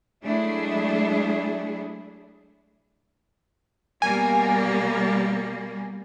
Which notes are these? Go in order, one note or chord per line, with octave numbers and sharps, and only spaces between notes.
F#3 G#3 A3 D4 E4 G#4
B2 G3 A#3 G#5